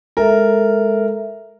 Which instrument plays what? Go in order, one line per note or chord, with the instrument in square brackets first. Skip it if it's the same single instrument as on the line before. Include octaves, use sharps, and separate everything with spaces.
[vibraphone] G#3 A4 E5 [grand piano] A#4